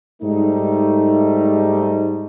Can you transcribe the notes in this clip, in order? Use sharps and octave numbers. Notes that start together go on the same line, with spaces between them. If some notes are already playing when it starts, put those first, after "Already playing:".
G#2 G3 A3 D#4